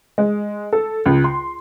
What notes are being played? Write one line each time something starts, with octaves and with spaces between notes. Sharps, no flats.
G#3
A4
C#2
C6